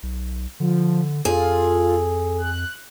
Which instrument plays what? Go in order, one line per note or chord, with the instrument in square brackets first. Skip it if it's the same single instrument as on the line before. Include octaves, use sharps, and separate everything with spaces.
[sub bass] B1
[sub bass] D3 [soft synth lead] F3
[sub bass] F2 [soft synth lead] F4 [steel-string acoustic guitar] G#4 [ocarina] A4
[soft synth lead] F#6